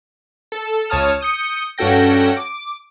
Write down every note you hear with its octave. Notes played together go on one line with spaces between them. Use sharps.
A4
C#2 C#5 A5 D#6 F6
D#6 G6 C#7
G2 C#4 F#4 A4 G5 A#6
D6